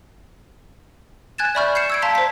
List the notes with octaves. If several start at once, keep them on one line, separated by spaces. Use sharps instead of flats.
G#5 F#6 G#6 A6 E7
D5 E5 B5 C#6 F6 G6
G6 C7 C#7 E7
E6 G#6 D7
F5 A5 A#5 C6 B6
C5 B6